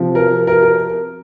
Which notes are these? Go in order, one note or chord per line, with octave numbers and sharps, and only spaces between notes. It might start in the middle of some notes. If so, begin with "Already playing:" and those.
Already playing: C3 F3
A#4
A#4
A#4